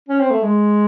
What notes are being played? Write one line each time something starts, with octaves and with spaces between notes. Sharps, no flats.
C#4
C4
A3
G#3